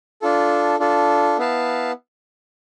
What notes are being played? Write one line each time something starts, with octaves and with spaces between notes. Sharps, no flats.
D4 F4 A4
D4 F4 A4
B3 E4 B4 F5 A5